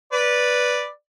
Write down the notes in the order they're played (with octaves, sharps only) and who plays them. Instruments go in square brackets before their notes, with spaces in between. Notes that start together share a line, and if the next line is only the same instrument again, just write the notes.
[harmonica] B4 D5